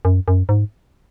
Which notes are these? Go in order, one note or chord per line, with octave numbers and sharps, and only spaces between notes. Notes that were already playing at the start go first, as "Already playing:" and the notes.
F#2
F#2
G#2